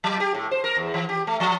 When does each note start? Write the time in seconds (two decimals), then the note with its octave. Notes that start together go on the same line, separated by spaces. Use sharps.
0.04 F#3
0.20 G4
0.35 A2
0.51 C5
0.64 A#4
0.77 E2
0.94 E3
1.09 G4
1.27 A3
1.40 F3